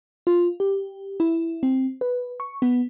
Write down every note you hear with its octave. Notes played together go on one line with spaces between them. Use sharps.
F4
G4
E4
C4
B4
C#6
B3